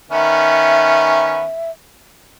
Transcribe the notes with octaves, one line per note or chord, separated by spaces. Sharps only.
D#3 B3 C#4 E5